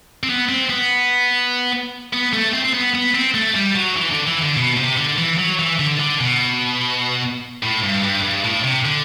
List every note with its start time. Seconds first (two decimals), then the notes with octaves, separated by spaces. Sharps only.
0.23 C4
0.29 B3
0.49 C4
0.70 B3
2.13 B3
2.33 A3
2.53 C4
2.64 C4
2.74 B3
2.94 B3
3.15 C4
3.34 A3
3.55 G3
3.76 F#3
3.96 E3
4.11 D3
4.27 E3
4.42 D3
4.57 B2
4.77 C3
4.97 D3
5.18 E3
5.38 F#3
5.59 E3
5.80 D3
6.00 D3
6.20 B2
7.63 A2
7.84 G2
8.04 G2
8.23 G2
8.45 A2
8.64 C3
8.85 D3